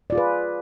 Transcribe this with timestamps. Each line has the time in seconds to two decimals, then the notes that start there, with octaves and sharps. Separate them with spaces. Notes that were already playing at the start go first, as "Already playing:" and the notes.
0.10 D5
0.12 F4
0.15 G#4
0.17 B4